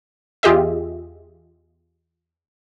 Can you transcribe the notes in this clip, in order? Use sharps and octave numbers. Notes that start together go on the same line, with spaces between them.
E2 F4 G4 G#4 D#5 E5